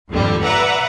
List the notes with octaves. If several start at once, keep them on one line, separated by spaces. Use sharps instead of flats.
G#1 F2 A#2 D3 G3
B4 D5 E5 F#5 A#5